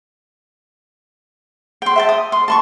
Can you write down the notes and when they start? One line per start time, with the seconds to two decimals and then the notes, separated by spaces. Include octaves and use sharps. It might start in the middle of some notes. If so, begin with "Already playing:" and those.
1.82 G5 C6
1.96 E5 G5 A5
2.09 D#6
2.32 C6
2.48 A5 C6 C#6